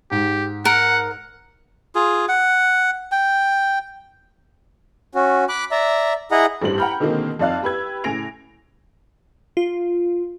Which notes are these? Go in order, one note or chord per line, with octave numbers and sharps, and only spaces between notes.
G#2 G4
A#4 F#5
F4 G#4
F#5
G5
C#4 F#4
B5 D6 F#6
D5 E5 A#5
E4 G#4 D#5 F#5 A#5
A1 G2 G3 C5 F#7
F#5 G5 A#5 B5 F6 G6
B2 D3 D#3 G#3 A#3 C4
F2 D#4 D5 F5 F#6
G4 B4 E6 G#6
A2 C#3 G#5 A#6 D7 F7
F4